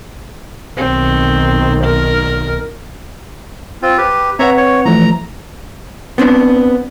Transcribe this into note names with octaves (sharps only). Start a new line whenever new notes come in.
B1 D#3 C4
A#4
C4 F4
G4 B4
C4 B4 C#5 E5 F#5 A#5
C#5
E3 F3 A3 A#5
B3 C4 D4